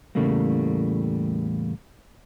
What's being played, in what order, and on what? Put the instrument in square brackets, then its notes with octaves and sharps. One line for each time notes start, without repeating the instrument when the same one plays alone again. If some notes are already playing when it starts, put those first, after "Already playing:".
[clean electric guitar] E2 A2 C#3 G3 A3 A#3